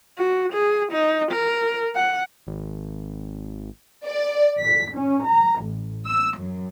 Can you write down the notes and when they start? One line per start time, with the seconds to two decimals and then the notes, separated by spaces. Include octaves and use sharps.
0.18 F#4
0.53 G#4
0.92 D#4
1.32 A#4
1.96 F#5
2.47 G#1
4.05 D5
4.60 B6
4.94 C#4
5.28 A#5
5.62 A1
6.06 E6
6.38 F#2